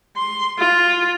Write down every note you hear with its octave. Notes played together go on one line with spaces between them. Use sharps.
C6
F4